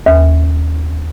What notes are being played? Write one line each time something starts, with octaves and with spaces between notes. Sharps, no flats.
D#2